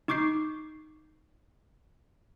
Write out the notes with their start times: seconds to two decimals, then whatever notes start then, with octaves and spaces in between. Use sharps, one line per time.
0.08 D#4 C#6 D6 G6 C7